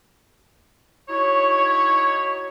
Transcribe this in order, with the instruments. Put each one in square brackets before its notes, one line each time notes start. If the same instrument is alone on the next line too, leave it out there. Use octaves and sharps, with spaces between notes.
[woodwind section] D#4 E4 F#4 C#5